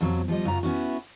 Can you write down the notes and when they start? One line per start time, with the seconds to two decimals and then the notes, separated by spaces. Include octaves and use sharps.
0.01 F2 B2 F#3
0.28 F3 G3 D#5
0.45 F#2 C#3 F4 A#5
0.63 B3 C#4 E4 F#4